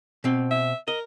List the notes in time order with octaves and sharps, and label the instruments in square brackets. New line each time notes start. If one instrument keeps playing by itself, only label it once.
[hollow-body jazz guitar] B2 C4
[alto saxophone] E5
[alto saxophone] A#4 [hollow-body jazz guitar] D#5